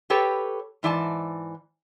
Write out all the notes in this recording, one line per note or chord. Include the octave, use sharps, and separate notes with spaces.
G4 A4 B4 C#5 G5
G#2 E3 D5 G#5 A5